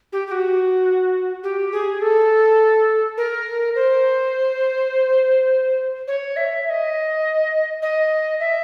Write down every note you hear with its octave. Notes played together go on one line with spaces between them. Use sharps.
G4
G4
F#4
G4
G#4
A4
A#4
C5
C#5
E5
E5
D#5
D#5
E5